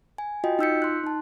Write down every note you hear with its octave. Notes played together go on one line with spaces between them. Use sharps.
G#5
F4 F#4 D#5 G5
D#4 F4 E6 G6 B6 C#7
C6 F#6
D#4 A5